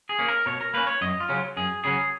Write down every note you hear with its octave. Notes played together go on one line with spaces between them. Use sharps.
G#4
A#3 C#4
A#4
B2 C#5
A#4
A#3 C#4 B4
C#5
F#2 D#5
F4
C#3 F#3 C#4
F#2 G#4
C#3 F#3 C#4 G#4